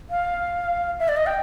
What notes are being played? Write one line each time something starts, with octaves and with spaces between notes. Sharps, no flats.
F5
E5
D5
D#5
G5